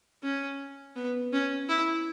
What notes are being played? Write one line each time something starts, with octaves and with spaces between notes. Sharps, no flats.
C#4
B3
C#4
E4